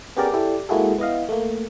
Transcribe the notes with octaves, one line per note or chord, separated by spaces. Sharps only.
B3 C#4 G4 G#4 A#4 D5
E4 G4 A4 D5
G#3 A#3 E4 F#4 G#4 A4
B3 E4 D#5 F5
A3 A#3